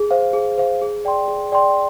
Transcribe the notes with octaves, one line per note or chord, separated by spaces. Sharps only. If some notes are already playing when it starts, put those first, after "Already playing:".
Already playing: G#4
C5 F5
G#4
C5 F5
G#4
D5 G5 C6
G#4
D5 G5 C6